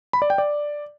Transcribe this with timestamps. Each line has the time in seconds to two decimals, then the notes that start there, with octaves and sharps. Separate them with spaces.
0.13 B5
0.22 D5
0.30 G5
0.38 D5